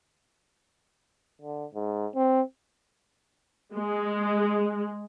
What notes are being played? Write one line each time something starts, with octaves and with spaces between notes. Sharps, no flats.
D3
G#2
C4
G#3